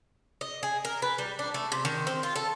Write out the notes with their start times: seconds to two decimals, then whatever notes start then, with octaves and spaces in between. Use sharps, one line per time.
0.41 D#5
0.63 G#4
0.85 A#4
1.02 B4
1.18 G3
1.39 D4
1.54 A3
1.72 C3
1.85 D#3
2.07 C4
2.23 F4
2.36 A4